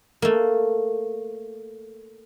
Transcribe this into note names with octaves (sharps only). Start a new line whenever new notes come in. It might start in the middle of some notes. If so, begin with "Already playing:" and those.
A3 A#3